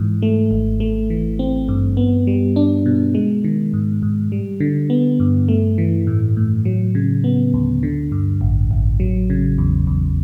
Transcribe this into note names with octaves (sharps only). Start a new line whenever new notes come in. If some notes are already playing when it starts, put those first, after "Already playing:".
Already playing: G#2 E3
A3
G#1
A3
E3
C4
G2
B3
G3
D4
B2
G#3
D#3
G#2
G#2
G3
D3
B3
G2
A3
E3
A2
A2
F#3
C#3
B3
D2
D3
G2
A1
A1
F#3
C#3
E2
E2